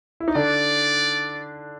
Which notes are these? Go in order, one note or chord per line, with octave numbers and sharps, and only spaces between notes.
E4
D#4
D3 D4 D5